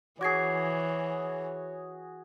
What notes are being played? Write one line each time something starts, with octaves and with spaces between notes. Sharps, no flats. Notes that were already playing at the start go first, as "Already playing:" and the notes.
E3 F#4 G#4 C#5 D6 G#6 C7